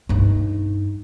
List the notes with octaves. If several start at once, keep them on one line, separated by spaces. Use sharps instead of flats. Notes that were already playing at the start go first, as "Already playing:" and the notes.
G2 D#4